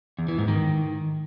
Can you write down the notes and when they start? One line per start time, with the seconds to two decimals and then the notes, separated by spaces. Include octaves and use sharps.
0.19 E2
0.28 E3
0.38 G#2
0.48 D#3